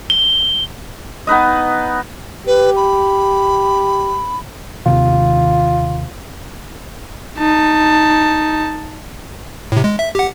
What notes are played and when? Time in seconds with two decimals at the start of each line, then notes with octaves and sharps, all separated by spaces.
0.10 G7
1.27 B3 D#4 B4 D#5
2.47 G4 B4
2.76 B5
4.86 D#2 C3 D#3 F4
7.38 D#4 A5
9.72 A2 C3
9.84 G#3
9.99 E5
10.15 G4 F#5